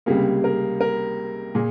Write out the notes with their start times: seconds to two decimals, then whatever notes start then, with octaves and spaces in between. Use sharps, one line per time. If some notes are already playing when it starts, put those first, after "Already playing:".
0.06 C#2 C3 G3 A#3 G#4
0.44 A#4
0.81 A#4
1.55 A#2 G#4